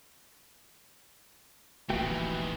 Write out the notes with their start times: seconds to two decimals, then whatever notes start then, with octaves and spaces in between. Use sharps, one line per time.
1.90 D1 A#1 C3 D#3 E3 A3 F#4 G5